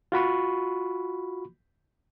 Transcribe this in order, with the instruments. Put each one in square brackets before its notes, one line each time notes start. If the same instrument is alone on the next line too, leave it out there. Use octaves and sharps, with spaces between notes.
[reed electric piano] F4 F#4 B5 C#6